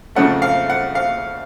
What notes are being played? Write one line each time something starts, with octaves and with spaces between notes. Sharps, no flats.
F2 C#3 F#3 A3 F#5
F5
F#5
F5